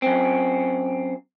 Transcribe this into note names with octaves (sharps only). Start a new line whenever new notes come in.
F#2 C4